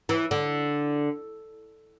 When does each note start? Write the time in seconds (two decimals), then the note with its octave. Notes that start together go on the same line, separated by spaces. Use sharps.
0.09 E3
0.31 D3